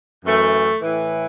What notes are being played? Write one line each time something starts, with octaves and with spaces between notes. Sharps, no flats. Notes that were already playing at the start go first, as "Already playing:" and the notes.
F#2 E3 A3
A2 E3